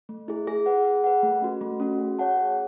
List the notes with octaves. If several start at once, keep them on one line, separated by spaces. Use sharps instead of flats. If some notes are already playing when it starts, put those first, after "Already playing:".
A3
E4 G#4
G#4
B4 F#5
G#4
B4 F#5
A3
C#4 F#4
A3
C#4 F#4
G#4
C#5 F#5 A5
G#4